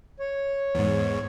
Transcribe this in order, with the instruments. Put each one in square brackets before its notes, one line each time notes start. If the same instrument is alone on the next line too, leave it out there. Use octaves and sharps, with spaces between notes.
[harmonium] C#5
[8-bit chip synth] E2 G#2